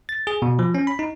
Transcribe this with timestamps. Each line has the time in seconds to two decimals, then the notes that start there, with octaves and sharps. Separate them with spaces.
0.09 A6
0.27 G#4
0.42 B2
0.59 F3
0.75 C#4
0.87 B5
0.99 D#4